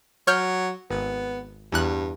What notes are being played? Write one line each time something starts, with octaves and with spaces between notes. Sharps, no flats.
F#3 C#5 F6 G6
G#1 B3
E2 G2 F#6